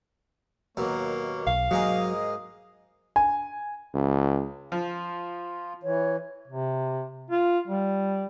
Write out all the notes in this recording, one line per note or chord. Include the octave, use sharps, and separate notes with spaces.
D#2 B2 F#3 A#3 C#5
B1 F5
G#2 F#3 A#3 G#4 D#5
G#5
C#2
F3 F4
E3 C#5
C3
F4
G3